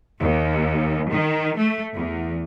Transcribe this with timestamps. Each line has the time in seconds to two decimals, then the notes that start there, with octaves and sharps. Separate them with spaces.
0.20 D#2
1.10 D#3
1.57 A3
1.94 E2